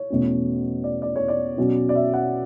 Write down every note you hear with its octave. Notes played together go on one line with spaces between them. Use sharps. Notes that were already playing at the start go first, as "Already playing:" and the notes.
Already playing: C#5
E2 B2 A3 C#4
D5
D5
C#5
D5
B2 F#3 C#4
D5
E5
F#5